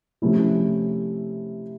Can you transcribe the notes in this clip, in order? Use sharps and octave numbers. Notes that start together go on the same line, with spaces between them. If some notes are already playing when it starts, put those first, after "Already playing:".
C3 F3 A3 C#4 E4